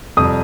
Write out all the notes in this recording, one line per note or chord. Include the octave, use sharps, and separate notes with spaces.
F2 C3 G3 D#6